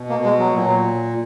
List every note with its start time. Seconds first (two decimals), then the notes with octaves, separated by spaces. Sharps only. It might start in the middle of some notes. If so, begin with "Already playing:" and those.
Already playing: B2
0.09 A#3
0.25 G#3
0.40 F#3
0.55 A#2 F#3